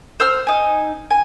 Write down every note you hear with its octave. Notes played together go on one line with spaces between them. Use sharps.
C5 E6 F6
D#4 G#5
G#5